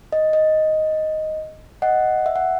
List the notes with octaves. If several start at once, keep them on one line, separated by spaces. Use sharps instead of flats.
D#5
D#5
D#5 F#5
E5
F#5